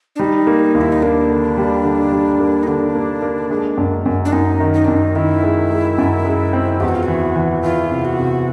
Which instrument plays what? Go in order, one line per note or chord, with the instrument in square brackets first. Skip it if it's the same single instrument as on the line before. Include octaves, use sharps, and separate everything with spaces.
[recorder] D4
[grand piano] G3 [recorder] D#4
[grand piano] A#3
D#2
[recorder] E4
D#4
[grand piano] A#3 [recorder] D4
[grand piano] D3
G3
D3
G3
A#3
[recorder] D#4
[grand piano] D3 [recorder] D4
[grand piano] A#3
A#3
G#3
F#2
F#2
[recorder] D4
[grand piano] F#2 [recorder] D#4
[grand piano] D#3
[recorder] D#4
[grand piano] F#2 [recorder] D4
[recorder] D#4
[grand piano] D#3 [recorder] E4
[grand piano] G#3
G#3
F#2
G#3
C4
[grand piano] E2 [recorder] G4
[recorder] F#4
F4
F#4
[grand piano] E3
E3
[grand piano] E3 [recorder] F4
[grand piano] C3
[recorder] F#4
[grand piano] C3